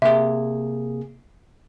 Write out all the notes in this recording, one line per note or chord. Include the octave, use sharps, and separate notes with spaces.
C3 A#3 G#4 E5